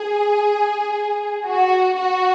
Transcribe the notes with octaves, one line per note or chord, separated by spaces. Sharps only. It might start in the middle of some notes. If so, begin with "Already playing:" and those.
Already playing: G#4
F#4
F#4